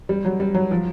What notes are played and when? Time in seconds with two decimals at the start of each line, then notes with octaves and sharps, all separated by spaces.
0.09 G3
0.25 F#3
0.40 G3
0.55 F#3
0.71 F3